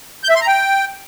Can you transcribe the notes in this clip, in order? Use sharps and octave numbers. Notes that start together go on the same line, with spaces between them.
G6
E5
C6
A#5
G5